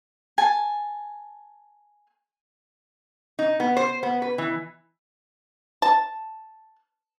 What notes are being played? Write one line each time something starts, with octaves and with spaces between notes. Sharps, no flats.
G#5 A5
D#4
B3
C5
B3
B4
E3
A5